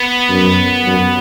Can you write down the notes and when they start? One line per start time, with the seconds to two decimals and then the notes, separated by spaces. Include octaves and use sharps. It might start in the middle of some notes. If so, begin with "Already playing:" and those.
Already playing: B3
0.30 F#2
0.87 F#2